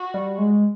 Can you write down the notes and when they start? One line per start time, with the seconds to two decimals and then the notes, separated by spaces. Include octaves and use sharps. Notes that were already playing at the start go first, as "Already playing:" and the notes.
Already playing: F#4
0.14 G3
0.38 G#3